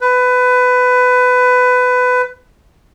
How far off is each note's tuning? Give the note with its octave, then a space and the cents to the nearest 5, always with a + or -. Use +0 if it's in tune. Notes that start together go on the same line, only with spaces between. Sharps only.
B4 +20